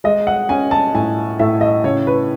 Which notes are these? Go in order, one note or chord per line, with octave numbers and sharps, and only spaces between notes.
G#3 D#5
F#5
C#4 G#5
A5
A2 G#5
A2 E5
D#5
C#3 C#5
B4